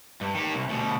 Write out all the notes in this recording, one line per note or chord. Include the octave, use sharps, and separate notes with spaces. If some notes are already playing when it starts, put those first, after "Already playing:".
G2
D#3 G4
C2
D2 B2